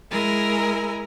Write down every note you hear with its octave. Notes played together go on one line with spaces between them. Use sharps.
G#3 E4 A#4 G#5